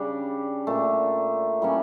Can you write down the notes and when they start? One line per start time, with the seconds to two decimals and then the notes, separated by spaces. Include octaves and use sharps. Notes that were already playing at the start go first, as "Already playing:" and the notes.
Already playing: C#3 G3 D4 G4
0.67 A#2 A3 D4
1.62 E3 G3 A#3 C#4